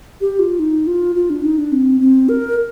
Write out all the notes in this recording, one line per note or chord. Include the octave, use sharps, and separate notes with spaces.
G4
F4
D#4
F4
F4
D4
D#4
D4
C4
C4
A#4